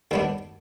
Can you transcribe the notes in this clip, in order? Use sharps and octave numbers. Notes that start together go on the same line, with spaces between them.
D#2 D#3 G3 B3 D4